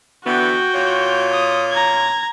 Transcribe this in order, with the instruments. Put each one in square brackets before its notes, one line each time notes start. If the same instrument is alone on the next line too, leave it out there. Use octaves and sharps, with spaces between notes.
[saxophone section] D3 E3 B3 [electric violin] F#4 G5
[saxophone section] A#2 F4 C#5
[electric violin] D#6
A#5 G#6